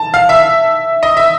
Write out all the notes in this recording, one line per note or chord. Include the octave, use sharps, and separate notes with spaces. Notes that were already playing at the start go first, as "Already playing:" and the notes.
Already playing: A5
F5
E5
D#5
E5